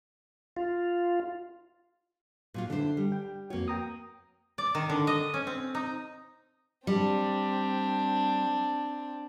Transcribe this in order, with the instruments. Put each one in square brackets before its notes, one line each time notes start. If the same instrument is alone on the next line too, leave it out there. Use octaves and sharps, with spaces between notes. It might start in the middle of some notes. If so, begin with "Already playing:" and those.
[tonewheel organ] F4
[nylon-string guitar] A#2 F#3 F4
[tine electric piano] D3 [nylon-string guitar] D4 E4 C5
[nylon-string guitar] G3
[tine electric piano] G5
[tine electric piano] F2 F#4 [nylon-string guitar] A#3 C#5
[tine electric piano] G5 A#5 D#6
[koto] D5
D#3
D3
D#5
C#4
C4
D#4
[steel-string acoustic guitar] G3 [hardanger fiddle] C4 D4